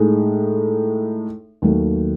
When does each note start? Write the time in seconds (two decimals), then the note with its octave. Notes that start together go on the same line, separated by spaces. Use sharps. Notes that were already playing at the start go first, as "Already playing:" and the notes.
Already playing: A2 G#3 D#4
1.62 D#2 D#3 F#3 A3